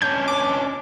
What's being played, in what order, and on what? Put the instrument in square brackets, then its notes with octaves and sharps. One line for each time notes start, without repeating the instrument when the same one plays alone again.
[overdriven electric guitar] C#4 D4 [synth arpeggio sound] G6
[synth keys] D6